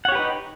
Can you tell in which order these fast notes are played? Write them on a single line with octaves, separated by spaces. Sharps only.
F#5 C#5 G4 B4 D#4